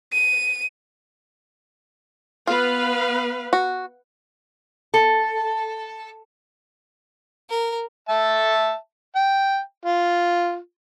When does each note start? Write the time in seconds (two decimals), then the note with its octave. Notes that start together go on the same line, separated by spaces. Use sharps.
0.12 D#7
2.47 B3 F4 B4 F5
3.53 F#4
4.94 A4
7.50 A#4
8.09 E5 A5
9.15 G5
9.85 F4